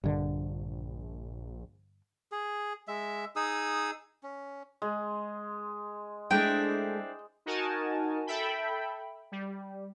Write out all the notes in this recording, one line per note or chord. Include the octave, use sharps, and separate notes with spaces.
A#1 G2 D3
G#4
G#3 E5
D#4 G#4 D#6 E6
C#4
G#3
G#3 A3 C4 D4 E4 G5
D#4 F#4 A#4 G#5 A5
A4 E5 G5 B5
G3